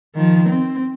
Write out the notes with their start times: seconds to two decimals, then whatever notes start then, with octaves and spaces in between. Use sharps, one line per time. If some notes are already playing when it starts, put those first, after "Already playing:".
0.15 D#3 F3
0.49 C4